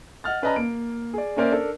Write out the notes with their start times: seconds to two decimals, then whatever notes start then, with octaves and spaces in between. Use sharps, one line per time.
0.24 D#5 F#5 F6 A6
0.42 C#4 B4 D5 D#5 A5 A#5
0.56 A#3 D7
1.14 G#4 D5
1.36 A#3 C#4 A#4 C5 D5 E5
1.51 D4 A4 A#4